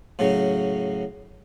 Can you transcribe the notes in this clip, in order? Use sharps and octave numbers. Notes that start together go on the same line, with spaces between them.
A2 C#3 F#3 C#4